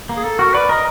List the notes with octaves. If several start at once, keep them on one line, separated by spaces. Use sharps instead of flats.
A#3
G#4
A4
F#4 A#4
B4 D5
A#4 D#5